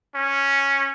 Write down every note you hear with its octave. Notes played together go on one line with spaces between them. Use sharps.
C#4